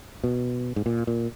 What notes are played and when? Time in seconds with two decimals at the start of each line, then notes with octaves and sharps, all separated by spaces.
0.24 B2
0.76 G#2
0.86 A#2
1.07 A#2